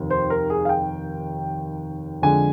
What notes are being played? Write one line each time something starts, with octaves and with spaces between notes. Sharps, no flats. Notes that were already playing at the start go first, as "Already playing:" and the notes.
Already playing: F1 D#2 D#3
C5
A#4
G#4
F5
G5
F2 D3 G#3 G#5